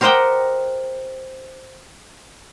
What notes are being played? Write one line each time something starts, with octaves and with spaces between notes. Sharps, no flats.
G4 A#4 C5 D#5 F#5 G5